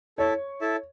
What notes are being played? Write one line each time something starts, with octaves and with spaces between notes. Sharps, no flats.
E4 A4 C#5 E5 A5
E4 A4 E5 A5